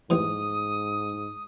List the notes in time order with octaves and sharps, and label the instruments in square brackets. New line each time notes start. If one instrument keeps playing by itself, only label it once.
[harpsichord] A1 E3 [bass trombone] G#2 [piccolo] D#6